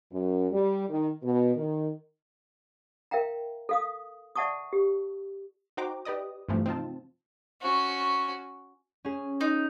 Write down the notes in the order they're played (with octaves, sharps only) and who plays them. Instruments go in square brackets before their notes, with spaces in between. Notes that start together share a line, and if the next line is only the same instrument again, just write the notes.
[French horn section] F#2
G3
D#3
B2
D#3
[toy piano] A#4 E5 F5 G5 A#5
A4 F5 D#6
D5 E5 F#5 A5 C#6 D#6
G4
[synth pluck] D#4 F#4 C5 G5 A#5 D6
G4 B4 D5 D#5 D#6
G2 C3 E3 F3 A3
C4 D#4 F4 A5
[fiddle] C#4 F#4
[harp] C#4 G#4
[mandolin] D#4